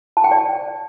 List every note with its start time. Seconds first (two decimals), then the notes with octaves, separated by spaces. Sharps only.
0.17 A5
0.24 G5
0.31 D5